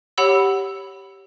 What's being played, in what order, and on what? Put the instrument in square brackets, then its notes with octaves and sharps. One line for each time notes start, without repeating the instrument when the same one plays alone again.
[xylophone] G4 C#5 F#5 B5 E6